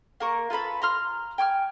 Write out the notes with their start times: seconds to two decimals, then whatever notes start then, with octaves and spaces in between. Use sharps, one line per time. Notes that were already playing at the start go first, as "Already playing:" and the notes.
0.20 A#3 A#4 C#6
0.50 F4 A4 B4 B5
0.82 A#5 C6 F6
1.38 G5 G#5 D6 F6